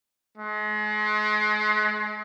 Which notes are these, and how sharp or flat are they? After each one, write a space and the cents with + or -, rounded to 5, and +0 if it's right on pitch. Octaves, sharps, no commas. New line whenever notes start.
G#3 +35